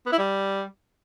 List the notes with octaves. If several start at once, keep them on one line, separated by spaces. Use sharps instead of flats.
B3
E4
G3